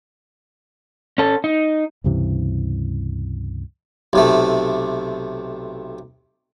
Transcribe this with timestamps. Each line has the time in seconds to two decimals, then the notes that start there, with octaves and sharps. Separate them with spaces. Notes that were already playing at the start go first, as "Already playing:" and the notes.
1.18 C#4 A4
1.44 D#4
2.04 C#2 G2 C3 E3
4.13 B1 C3 A3